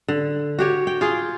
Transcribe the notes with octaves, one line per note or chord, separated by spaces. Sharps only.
D3
F#4 G4 C#5
G5
F4 G#4